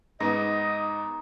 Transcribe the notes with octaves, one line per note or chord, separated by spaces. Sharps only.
G#2 B3 D#4 D#5